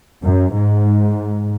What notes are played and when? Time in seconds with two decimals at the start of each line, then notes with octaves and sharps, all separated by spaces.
0.23 F#2
0.54 G#2